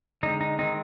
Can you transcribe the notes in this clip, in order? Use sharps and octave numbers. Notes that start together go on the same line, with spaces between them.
D3 G#3 C4 D#4
D#4
D#3 G#3 C4 D#4